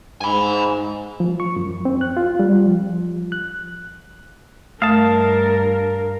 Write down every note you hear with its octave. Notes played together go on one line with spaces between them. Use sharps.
G#2 G#5 B5
F3
C#6
F#2
C4
F#6
F4
G3
F3
F#6
G2 A3 A#4 F5 A5